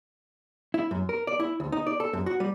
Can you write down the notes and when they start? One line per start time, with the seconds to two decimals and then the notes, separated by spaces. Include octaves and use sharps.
0.74 E4
0.91 F#2
1.09 A#4
1.27 D5
1.40 E4
1.60 D2
1.72 D#4
1.87 D5
2.00 A4
2.13 F#2
2.26 F#4
2.40 G3